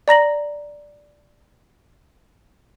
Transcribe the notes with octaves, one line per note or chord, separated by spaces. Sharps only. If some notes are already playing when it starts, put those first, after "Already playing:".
D5 A#5 A#6 F#7